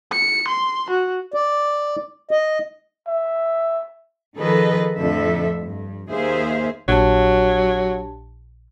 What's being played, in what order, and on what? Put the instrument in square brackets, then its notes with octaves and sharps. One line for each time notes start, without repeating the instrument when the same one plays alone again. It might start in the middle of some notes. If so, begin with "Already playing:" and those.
[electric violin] C#7
C6
F#4
[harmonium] D5
D#5
[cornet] E5
[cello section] D#3 F3 G#4 A4 B4 D#5
F2 A2 D3 A4 E5
G2
D#2 A#3 G#4 C5 E5 F5
[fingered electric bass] A#1 [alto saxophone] F#3 [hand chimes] D4 G4 A5